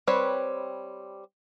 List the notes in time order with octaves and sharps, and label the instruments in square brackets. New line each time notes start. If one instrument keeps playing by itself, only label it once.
[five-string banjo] G3 C4 B4 C#5